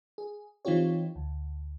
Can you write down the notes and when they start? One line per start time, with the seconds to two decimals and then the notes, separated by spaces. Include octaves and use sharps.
0.18 G#4
0.65 E3 C4 D#4 F4 G4 C#5
1.16 D2